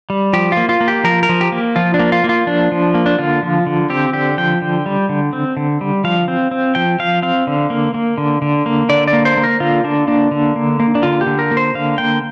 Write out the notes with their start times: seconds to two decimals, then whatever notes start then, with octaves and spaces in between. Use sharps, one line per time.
0.10 G3
0.33 F3 G4
0.52 F4
0.57 A#3
0.69 F4
0.81 A#3
0.88 G4
1.04 F3 A#4
1.23 A#4
1.29 F3
1.41 G4
1.52 A#3
1.76 F3 F4
1.94 D4
1.99 A#3
2.12 F4
2.24 A#3
2.29 F4
2.47 F3 D4
2.72 F3
2.94 A#3
3.06 D4
3.18 D3 F4
3.43 F3
3.67 D3
3.90 C4 G4
4.13 D3 G4
4.38 F3 G5
4.62 D3
4.86 G3
5.09 D3
5.33 C4
5.57 D3
5.81 G3
6.04 F3 F5
6.28 C4
6.51 C4
6.75 F3 G5
6.99 F3 F5
7.22 C4 F5
7.47 D3
7.70 A#3
7.94 A#3
8.18 D3
8.42 D3
8.66 A#3
8.89 D3 D5
9.08 D5
9.13 A#3
9.25 C5
9.37 A#3
9.44 A#4
9.60 D3 F4
9.84 D3 D4
10.08 A#3 D4
10.31 D3
10.56 A#3
10.80 A#3
10.95 D4
11.03 D3 F4
11.21 G4
11.27 D3
11.39 A#4
11.51 A#3
11.57 C5
11.74 D3 F5
11.98 A#3 G5